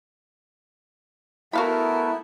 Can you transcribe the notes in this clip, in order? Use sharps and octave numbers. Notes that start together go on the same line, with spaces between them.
A3 B3 E4 F#4 A#4 F5 B5